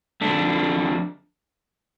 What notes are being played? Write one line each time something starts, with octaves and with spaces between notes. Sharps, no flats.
F2 D3 A3 D4